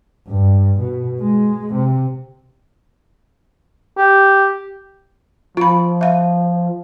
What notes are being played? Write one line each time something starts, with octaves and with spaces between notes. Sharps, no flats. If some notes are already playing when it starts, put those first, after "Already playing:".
G2
B2
G#3
C3
G4
F3 F4 B5
E5 F5